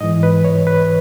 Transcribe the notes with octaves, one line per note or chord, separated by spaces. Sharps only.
G#2 E3 D#5
B4
C#5
B4